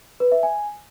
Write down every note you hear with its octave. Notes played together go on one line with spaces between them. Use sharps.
B4
E5
G#5